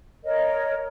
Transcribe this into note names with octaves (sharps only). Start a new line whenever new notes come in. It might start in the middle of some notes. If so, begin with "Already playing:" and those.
A#4 C#5 D#5